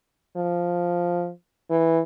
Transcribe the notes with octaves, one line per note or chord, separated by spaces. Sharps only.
F3
E3